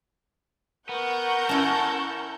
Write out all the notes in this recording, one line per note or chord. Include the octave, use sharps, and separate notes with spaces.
B3 A#4 F#5 C#6 G6
C#4 E4 A4